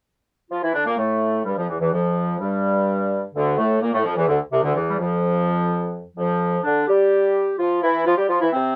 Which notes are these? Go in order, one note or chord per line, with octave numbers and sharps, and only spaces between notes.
F3 F4
E3 E4
D3 D4
A#2 A#3
A2 A3
G2 G3
F2 F3
E2 E3
E2 E3
F2 F3
G2 G3
D2 D3
A2 A3
A#2 A#3
A2 A3
F2 F3
E2 E3
D2 D3
C2 C3
D2 D3
E2 E3
G3
F2 F3
F2 F3
D3 D4
G3 G4
F3 F4
E3 E4
F3 F4
G3 G4
F3 F4
E3 E4
C3 C4